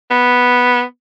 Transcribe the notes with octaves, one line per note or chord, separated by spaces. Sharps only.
B3